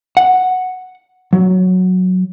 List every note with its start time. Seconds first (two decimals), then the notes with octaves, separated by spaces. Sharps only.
0.17 F#5
1.33 F#3